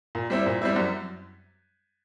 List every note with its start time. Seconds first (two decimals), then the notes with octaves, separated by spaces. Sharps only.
0.15 A#2
0.30 G3 C4 E4
0.46 A#2
0.62 G3 C4 E4
0.76 F#2